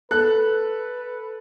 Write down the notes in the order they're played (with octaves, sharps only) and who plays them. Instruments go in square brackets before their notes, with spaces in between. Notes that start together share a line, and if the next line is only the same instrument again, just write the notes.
[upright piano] A4 F#6 [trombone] B4